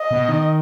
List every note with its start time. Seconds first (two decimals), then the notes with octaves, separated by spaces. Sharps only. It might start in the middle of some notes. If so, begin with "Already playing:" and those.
Already playing: D#5
0.11 B2
0.29 D#3